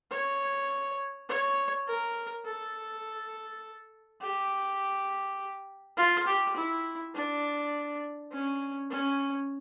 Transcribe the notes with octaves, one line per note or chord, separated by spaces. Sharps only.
C#5
C#5
A#4
A4
G4
F4
G4
E4
D4
C#4
C#4